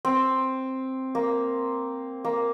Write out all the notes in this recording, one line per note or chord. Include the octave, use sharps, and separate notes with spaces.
C4
A#3
A#3